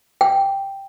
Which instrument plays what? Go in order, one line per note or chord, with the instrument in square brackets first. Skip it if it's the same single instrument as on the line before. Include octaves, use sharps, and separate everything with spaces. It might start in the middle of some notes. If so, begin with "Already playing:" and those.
[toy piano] G5